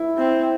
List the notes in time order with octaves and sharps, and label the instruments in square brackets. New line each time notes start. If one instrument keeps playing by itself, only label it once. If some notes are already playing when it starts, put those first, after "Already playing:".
Already playing: [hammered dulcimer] E4
[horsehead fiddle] C4